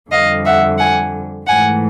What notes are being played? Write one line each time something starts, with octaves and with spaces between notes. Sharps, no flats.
F2 D3 G3 D#5 F5
E5 F#5
F#5 G#5
G#2 E3 A3 F#5 G#5